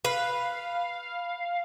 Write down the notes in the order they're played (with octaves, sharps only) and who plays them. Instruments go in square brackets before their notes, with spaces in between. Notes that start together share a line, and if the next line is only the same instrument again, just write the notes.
[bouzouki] B4 [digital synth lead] F5